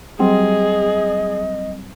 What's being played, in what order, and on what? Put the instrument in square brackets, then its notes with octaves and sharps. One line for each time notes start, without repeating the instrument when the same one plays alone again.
[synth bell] F#3 G3 C4 [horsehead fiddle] G#4 [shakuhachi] D#5